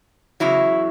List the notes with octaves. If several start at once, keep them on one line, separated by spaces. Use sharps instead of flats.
E2 C#3 F#3 E4